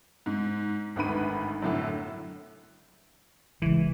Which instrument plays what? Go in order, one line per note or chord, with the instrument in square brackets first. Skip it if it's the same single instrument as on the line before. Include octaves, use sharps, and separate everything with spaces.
[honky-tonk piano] G#2
G#1 D2 D#3 B4 B5 D#7
F#2 A2 D3
[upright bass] C#3 G#3 [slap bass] E3